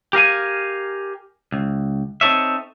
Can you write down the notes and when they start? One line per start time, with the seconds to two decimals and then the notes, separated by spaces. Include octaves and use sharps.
0.13 G4 A#4 F5 G#5
1.52 C#2
2.21 C4 D#4 A4 C#5 E5